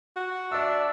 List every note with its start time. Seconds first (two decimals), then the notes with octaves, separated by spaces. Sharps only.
0.16 F#4
0.52 D4 D5 E5 E6